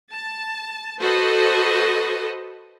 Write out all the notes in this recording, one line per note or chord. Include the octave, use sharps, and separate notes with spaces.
A5
F#4 A4 B4 C5 D#5